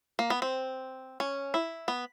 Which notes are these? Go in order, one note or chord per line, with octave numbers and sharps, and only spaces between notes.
A#3
B3
C4
C#4
E4
B3